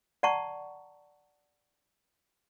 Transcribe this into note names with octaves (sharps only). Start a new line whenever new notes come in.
D5 F#5 A5 A#5 C#6